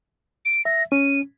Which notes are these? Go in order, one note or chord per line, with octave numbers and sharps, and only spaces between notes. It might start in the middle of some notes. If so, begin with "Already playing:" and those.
D7
E5 A#6
C#4 D#7